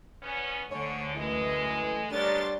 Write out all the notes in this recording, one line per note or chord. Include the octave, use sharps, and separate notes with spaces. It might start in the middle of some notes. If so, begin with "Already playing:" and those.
E2 B3 C#4
D2 G#2 D3 A3 C#5
F#2 E3 G#3
A3
G3 G#3 B3 D4 A#4 C#5 C6 A6